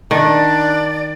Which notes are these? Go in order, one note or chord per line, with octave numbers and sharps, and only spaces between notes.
D#3 D4 D5